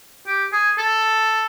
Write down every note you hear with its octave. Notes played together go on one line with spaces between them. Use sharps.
G4
G#4
A4